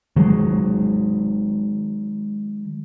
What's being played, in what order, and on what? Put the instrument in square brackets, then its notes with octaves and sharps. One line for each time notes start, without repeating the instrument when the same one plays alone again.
[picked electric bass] D#3 F#3 G#3